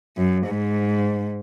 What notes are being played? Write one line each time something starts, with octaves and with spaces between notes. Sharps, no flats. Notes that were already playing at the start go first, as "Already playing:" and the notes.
F#2
G#2